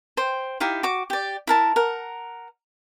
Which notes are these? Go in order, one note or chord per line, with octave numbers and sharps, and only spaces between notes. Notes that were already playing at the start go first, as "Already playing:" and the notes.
C5 G5
D#4 E4 G4 F5
F#4 D6
G4 D5
E4 A#4 A5
A#4 F#5